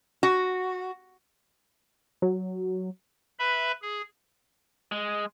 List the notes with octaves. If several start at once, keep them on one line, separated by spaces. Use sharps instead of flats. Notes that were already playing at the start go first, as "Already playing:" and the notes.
F#4
F#3
B4 E5 B5
G#4
G#3